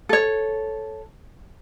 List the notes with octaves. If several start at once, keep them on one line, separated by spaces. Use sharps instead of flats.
A4 C#5